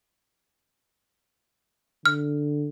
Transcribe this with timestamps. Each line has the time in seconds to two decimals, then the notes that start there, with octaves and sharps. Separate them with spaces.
2.06 D3 F6